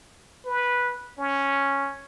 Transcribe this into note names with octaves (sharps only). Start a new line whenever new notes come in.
B4
C#4